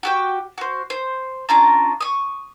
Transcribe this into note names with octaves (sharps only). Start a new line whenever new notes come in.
F#4 G4 G5
F#4 C5
C5
C#4 D4 F4 A#5
C#6 D#6